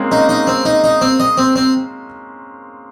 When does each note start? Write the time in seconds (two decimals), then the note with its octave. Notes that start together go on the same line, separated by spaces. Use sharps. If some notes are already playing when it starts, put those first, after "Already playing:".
Already playing: G#3 A#3 C4 C#4
0.11 A#3 C#4 D#4
0.29 D#4
0.47 C4
0.65 D#4
0.84 D#4
1.01 C4
1.20 D#5
1.37 C4
1.56 C4